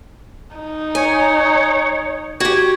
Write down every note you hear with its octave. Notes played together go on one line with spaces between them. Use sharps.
D#4
C#5 G#5
F#4 G4 G#6